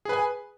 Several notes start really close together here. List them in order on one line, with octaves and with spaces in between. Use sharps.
G#4 B4 G#5